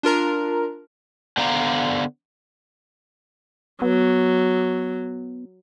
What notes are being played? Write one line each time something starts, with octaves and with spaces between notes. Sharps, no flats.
D4 F4 A#4 A#5
D3 B3 C5 D5 F5 A#5
F#3 B3